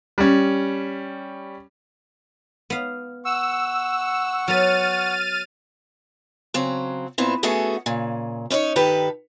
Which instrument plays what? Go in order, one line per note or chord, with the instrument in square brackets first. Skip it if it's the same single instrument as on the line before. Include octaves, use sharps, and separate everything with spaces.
[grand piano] G3 C#4
[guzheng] B3 F5
[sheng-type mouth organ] F#5 C#6 [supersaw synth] E6
[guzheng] F#3 B3 [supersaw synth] F6 A6 D#7
[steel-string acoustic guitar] C#3 F#3 C4
A#2 B3 C4 E4
A3 B3 C#4 F#4 G#4 A4
A#2 C#3
C#4 D#4 C5 C#5
G2 D#3 G4 A4 B4